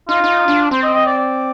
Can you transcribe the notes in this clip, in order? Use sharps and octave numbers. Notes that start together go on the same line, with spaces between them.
D#4 F4
D#4
D4
C4 C5
D#5
D#5
D5
D5